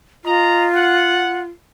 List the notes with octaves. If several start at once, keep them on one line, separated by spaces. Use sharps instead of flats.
F4 D#5 A#5
F#5